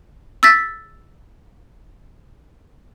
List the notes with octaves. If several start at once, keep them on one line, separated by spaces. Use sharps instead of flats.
E6 A6 B6